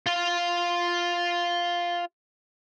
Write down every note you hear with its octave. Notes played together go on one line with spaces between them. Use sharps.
F4 F5